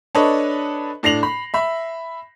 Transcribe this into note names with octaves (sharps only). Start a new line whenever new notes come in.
D4 A4 B4 C#5 D#5
A2 D4 A#6 C7 F7 F#7
B5
E5 B5